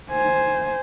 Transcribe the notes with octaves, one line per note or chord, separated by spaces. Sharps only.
C5 G#5